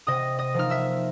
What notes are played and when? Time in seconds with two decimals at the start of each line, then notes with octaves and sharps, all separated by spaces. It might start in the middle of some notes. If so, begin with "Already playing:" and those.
0.07 C3 D#5 D#6
0.39 D#5 D#6
0.54 F3 A#3 D#4 F6
0.70 E5 E6